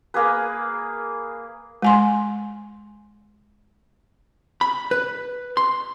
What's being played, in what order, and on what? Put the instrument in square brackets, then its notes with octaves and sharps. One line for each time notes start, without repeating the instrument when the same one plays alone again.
[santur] A#3 G#4 B4
[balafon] G#3 G#5 C6
[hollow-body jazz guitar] B5
B4
C6